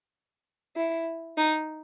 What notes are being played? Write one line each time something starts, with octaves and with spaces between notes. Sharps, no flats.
E4
D#4